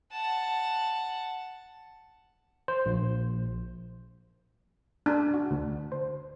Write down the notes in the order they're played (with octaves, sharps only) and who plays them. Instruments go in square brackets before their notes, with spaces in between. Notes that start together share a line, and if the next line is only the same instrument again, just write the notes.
[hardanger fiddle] F#5 A5
[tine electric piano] C5
A#1
[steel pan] D4 [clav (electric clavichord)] G#4 A4
[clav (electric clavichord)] F#4
D2
C5